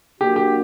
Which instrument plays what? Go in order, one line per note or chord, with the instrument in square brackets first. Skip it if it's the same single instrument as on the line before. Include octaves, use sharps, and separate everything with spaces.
[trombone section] F#3 A#3 D4 F#4 [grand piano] G4
[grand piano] G4